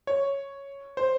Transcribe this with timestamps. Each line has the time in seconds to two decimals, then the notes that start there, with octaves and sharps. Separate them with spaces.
0.07 C#5
0.97 C5